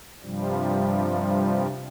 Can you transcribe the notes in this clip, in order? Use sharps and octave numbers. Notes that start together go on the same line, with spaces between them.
G2 C3 F3 G3